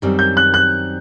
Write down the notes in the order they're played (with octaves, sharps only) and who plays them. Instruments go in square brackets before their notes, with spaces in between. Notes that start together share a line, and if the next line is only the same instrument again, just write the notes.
[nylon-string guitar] F#2 D#3 G3 C4
[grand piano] G6
F#6
F#6